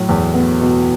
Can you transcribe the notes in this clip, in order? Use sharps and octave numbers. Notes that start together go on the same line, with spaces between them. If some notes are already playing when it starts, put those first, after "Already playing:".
Already playing: A2 F#3
E2
B3
B2